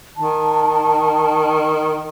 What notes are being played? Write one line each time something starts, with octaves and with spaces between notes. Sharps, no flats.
D#3 A5